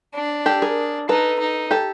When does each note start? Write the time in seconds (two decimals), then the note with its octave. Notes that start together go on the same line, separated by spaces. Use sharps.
0.14 D4
0.46 G4 A4
0.62 G#4 A#4
1.09 D#4 A4 B4
1.40 D#4
1.71 G4 A4